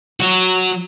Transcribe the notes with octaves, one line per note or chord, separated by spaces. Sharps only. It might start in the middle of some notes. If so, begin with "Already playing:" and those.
F#3 F#4